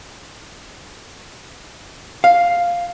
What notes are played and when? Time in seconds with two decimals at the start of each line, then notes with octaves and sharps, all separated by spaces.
2.24 F5